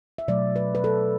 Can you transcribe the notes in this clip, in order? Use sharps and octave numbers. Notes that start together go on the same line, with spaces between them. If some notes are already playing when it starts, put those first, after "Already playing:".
E5
B2 F#3 A3 D5
B4
B4
A4